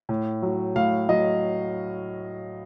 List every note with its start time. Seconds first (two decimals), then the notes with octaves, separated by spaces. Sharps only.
0.09 A2
0.42 F#3
0.76 A2 F5
1.09 F#3 D#5